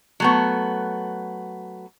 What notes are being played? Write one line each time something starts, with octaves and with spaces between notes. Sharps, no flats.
F#3 A3 B3